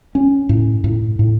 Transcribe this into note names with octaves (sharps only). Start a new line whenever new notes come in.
C#4
A2
A2
A2